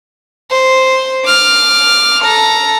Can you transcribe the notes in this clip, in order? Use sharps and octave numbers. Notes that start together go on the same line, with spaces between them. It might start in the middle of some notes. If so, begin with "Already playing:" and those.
C5
D6 F6
A4 A#5